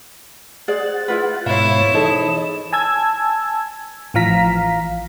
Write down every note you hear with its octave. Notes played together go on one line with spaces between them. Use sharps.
G#4 C5 D5 F#5 A6
E4 F4 B4
G#2 B2 E4 C5 C#5 F5 E7
E3 D#4 G#4 A4 C5 D#5
G#5 A5 E6 G#6
A1 E3 F3 F5 A#5 B6